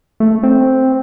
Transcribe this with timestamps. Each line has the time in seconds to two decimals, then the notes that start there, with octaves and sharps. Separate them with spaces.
0.20 A3
0.43 C4